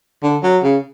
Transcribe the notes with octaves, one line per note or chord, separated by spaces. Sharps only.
D3
F#3
C#3